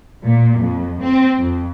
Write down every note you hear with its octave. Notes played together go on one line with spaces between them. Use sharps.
A#2
F2
C4
F2